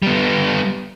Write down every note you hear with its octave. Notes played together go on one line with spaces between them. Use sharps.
G3 B3